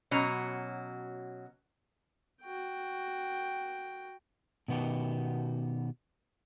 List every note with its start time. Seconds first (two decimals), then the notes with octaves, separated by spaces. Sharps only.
0.11 B2 F#3 C#4 A#5
2.42 F#4 G5
4.68 B2 D#3 B3 F#4 G4